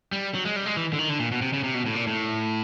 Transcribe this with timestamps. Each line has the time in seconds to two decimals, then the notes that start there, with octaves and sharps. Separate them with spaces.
0.13 G3
0.35 F#3
0.45 G#3
0.56 G3
0.66 G#3
0.77 E3
0.93 D3
0.99 D#3
1.09 D3
1.20 A#2
1.32 B2
1.42 C3
1.53 C#3
1.64 C3
1.75 B2
1.86 A2
1.96 A#2
2.07 A2